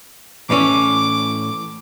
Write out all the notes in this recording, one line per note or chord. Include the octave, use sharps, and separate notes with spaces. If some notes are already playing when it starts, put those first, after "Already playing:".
A2 E3 C#4 D6